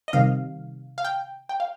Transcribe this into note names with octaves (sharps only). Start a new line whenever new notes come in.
D#5
C3 D#3 G3 F5
F5
G5
G5
F5